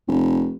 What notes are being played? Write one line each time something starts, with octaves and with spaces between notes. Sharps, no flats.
F1